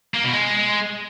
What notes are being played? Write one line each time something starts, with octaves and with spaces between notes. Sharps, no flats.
A#3
B2
G#3